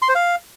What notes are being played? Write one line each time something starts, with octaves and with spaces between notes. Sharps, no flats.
C6
C5
F5